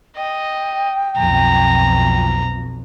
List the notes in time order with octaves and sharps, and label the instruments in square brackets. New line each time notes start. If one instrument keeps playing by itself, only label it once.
[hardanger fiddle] D#5 [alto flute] G5
[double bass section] B1 F2 [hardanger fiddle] A#5